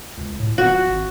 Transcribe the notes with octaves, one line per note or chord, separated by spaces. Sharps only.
C#2
A2
D1 F#4
G#1